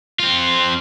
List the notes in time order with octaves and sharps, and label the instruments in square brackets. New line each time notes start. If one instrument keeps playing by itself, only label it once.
[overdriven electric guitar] C4 F4